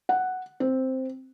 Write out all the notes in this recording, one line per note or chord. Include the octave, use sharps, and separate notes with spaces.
F#5
C4